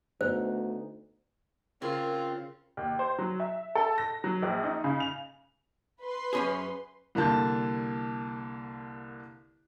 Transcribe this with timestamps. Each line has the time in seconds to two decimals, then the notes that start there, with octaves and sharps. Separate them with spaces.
0.21 D2 B3 D#4 C5
1.82 C#3 C4 F4 G#4 A#4
2.77 D#2
2.99 C5
3.18 F#3
3.40 E5
3.75 A4
3.98 A#6
4.24 F#3
4.42 A#1
4.64 D#4
4.84 C#3
5.00 F7
6.00 B4 C6
6.33 F#2 C#4 G#4
7.15 C2 D3 A#3 A5 G6